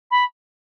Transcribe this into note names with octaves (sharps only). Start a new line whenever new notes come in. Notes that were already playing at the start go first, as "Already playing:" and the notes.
B5